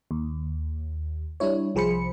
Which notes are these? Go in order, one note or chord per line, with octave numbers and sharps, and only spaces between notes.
D#2
G3 D4 E4 C#5
C2 F3 G#4 C5 B5 C#7